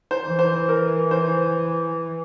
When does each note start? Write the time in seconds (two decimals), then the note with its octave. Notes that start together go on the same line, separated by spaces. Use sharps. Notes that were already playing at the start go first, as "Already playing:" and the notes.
0.11 C5
0.26 E3
0.39 C5
0.69 A#4
1.11 C5